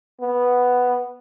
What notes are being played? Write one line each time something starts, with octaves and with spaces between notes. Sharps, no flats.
B3